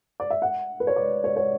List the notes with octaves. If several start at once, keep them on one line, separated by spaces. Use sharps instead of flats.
D5
E5
F#5
B4
C#5
D5
C#5
C#5